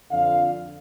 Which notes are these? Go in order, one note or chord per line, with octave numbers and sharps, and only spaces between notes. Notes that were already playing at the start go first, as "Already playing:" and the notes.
F2 D3 F5